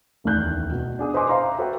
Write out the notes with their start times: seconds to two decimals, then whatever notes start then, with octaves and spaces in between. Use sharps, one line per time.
0.24 D1 E2 D#3 D5 F#6 G6
0.72 B2
0.99 D4 G#4 D#6
1.14 B4 C5 D#5 G#5 C6 D6
1.29 C5 E5 F5 A#5 C6
1.59 F#4 A4 B4 C5 G5